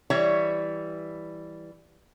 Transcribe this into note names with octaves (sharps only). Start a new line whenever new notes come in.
E3 G3 C#5 E5